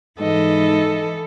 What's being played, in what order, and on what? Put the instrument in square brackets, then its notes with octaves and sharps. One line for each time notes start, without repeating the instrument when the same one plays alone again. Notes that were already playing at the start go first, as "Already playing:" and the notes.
[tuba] G#2 [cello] E3 A4 [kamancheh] D#5